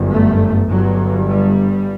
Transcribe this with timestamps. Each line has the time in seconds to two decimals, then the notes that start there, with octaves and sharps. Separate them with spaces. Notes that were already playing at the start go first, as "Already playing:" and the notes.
Already playing: G1 F#2
0.11 A3
0.69 G1 G2 F#3
1.28 G3